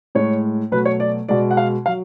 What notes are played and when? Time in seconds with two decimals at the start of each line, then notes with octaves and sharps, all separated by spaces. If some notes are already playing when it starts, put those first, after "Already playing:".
0.15 A2 G#3 C#5
0.72 B2 F#3 A3 B4
0.85 C#5
1.00 D5
1.29 B2 G#3 D5
1.51 F#5
1.57 F5
1.86 F#3 F5